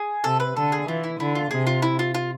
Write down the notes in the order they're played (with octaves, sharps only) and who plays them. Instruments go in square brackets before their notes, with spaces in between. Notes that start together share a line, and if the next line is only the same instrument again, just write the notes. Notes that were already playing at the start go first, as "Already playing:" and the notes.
Already playing: [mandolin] G#4
[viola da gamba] C3 [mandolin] A4
[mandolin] B4
[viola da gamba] D3 [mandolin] A4
[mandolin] G#4
[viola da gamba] E3 [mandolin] F4
[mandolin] E4
[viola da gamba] D3 [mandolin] E4
[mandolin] F4
[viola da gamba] C3 [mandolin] G#4
[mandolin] F4
E4
F4
F4